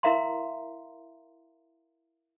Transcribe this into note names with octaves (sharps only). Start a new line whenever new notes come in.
E4 A#4 E5 F5 A#5 C6